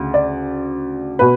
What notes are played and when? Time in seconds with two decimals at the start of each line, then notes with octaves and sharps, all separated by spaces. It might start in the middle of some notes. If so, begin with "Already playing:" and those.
Already playing: D2 C#3
0.14 D5
1.19 B2 B4